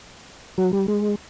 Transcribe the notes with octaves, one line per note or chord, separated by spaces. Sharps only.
F#3
G3
G#3